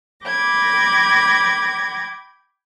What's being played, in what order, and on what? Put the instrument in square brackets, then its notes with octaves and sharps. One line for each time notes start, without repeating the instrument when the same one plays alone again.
[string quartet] G5 B5 D6 G#6 A#6